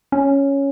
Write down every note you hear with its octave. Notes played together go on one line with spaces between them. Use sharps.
C#4